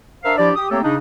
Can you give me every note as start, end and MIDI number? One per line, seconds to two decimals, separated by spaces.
0.24 0.34 62
0.24 0.34 70
0.24 0.34 72
0.24 0.34 76
0.24 0.34 77
0.38 0.50 53
0.38 0.50 62
0.38 0.50 64
0.38 0.50 67
0.38 0.50 74
0.55 0.68 67
0.55 0.68 87
0.71 0.81 57
0.71 0.81 58
0.71 0.81 60
0.71 0.81 67
0.71 0.81 69
0.71 0.81 73
0.83 0.96 49
0.83 0.96 62
0.83 0.96 63